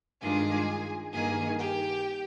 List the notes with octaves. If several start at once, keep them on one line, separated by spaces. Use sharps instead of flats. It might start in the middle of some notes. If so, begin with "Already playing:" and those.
G2 D#3 G#3 D4 F4 G#4 G#5
G2 D#3 A#3 G#4 G#5
G4 G5